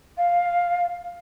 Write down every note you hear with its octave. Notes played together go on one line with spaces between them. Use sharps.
F5